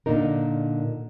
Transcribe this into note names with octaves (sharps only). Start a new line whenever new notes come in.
A#2 D3 D4 D#4 A#4